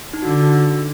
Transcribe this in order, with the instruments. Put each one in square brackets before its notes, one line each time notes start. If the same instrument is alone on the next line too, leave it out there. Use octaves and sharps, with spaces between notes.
[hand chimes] D#4
[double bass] D3 [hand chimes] F#4
[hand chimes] F#4